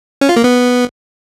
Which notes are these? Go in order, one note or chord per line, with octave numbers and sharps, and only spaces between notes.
C#4
F4
A#3
B3